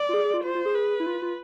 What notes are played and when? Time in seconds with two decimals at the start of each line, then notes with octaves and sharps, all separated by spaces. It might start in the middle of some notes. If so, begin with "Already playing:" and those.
Already playing: D5
0.09 F4
0.14 G#4
0.25 G#4
0.34 F4
0.44 F4 C5
0.55 F4
0.66 G#4
0.75 B4
1.00 E4
1.06 F4
1.22 F4